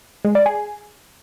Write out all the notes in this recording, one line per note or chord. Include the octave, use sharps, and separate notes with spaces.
G#3
D5
G#4